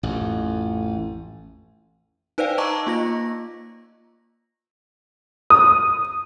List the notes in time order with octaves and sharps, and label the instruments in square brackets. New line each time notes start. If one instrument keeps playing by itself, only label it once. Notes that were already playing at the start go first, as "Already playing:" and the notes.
[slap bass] A1 F2
[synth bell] D#4 B4 C5 D5 F5 G5
D#5 A5 A#5 C#6 D6 E6
A#3 F4 A#6
[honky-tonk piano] D#6